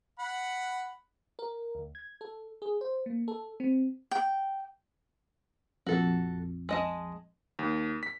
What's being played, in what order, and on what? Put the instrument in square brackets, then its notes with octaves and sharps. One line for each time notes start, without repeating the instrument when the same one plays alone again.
[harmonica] F#5 B5
[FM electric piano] A#4
D2
G#6
A4
G#4
C5
A#3
A4
C4
[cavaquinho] G5
[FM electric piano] A#1 F2 [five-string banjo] F#4 A4
[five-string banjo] G#3 D#5 A5
[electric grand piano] D#2
B6